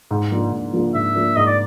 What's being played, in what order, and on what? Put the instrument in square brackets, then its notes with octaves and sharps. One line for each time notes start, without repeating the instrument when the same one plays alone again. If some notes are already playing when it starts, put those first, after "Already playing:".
[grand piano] G#2
F3 A#3 D4
G#2
F3 A#3 D4
[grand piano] G#2 [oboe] E5
[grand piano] F3 A#3 D4
[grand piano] G#2 [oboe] D#5
[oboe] D5